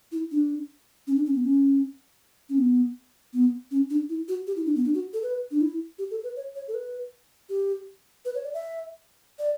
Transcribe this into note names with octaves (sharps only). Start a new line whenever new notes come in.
E4
D4
C#4
D4
C#4
B3
C#4
C#4
B3
B3
C#4
D4
E4
F#4
G4
E4
D4
B3
D4
F#4
A4
B4
D4
E4
G4
A4
B4
C#5
C#5
A4
B4
G4
B4
C#5
D5
E5
D5